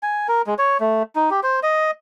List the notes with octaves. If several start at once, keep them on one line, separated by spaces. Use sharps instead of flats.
G#5
A#4
G#3
C#5
A3
D#4
G4
C5
D#5